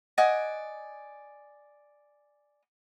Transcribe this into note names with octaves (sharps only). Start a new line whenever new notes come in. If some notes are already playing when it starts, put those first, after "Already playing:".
D5 D#5 F#5 G#5